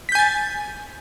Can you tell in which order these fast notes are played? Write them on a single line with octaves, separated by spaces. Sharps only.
B6 G6 G#5 A6